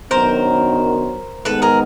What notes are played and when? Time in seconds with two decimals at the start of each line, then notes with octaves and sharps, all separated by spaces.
0.10 F#2 D#3 F#3 B3 D4 A#4 C5
1.45 G#2 D#3 G#3 B3 A4 B4
1.62 G#4 A#4